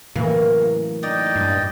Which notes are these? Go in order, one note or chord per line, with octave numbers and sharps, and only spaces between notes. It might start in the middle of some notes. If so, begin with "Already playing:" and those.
A2 C#3 E3 F#3 A#3
D#4 D5 D#5 G5
G2